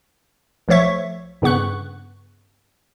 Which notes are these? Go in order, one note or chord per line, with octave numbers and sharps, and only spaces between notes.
B1 F3 A3 C#5 E5 C#6
G2 C#3 B3 C#6 F#6